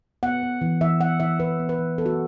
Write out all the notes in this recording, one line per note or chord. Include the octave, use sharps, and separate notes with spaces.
B3 F#5
B3
E3
E3 E5
B3 F#5
E3 E5
E3 B4
B3
B4
E3
B3 A4
F#4